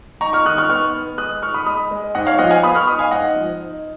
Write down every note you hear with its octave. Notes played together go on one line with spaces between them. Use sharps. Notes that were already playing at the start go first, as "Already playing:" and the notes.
D#4 A#5 C#6
C#6 F6
D#3 D#6 F#6
C#6 F6
B3 C#6 F6
B3
G#3 D#6 F#6
D#4 C#6 F6
B5 D#6
G#3 B5 D#6
G#3
G#2 D#5 F#5
C#5 F5
F3 D#5 F#5
F5 G#5
B3 B5 D#6
C#6 F6
D#4 B5 D#6
F5 G#5
G#2 D#5 F#5
F3
D#4